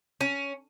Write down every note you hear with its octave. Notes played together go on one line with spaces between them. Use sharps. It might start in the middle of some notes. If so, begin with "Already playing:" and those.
C#4